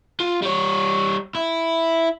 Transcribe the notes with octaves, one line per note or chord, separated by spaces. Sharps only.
F4
G3 C#5
E4